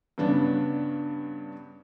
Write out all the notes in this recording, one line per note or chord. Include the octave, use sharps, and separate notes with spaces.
G2 C#3 B3 D4